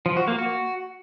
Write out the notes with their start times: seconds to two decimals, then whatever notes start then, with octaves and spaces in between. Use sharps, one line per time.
0.06 F3
0.17 F#4
0.28 A#3
0.39 F#4